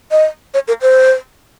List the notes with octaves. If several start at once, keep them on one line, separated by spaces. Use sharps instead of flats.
D#5
C#5
A#4
C5